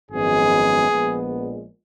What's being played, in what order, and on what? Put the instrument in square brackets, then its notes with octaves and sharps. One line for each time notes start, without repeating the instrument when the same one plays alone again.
[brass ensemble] G#1 F#2 F3 G#3 B3 G#4
A#1 A#2 F3 G#3 B3